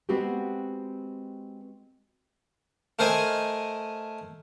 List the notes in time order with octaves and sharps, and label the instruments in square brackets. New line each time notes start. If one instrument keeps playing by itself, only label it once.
[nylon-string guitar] G#3 B3 C4 F#4 G4
[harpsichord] A3 A#4 C5 D#5 G#5